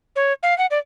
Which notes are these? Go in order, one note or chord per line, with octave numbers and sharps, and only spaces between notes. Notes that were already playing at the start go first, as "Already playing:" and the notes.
C#5
F5
F#5
D5